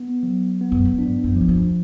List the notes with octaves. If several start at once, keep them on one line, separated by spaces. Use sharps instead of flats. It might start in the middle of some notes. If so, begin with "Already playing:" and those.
Already playing: B3
F#3
B3
F#2
G2
G#2 D4
F#2
E2 F3
F2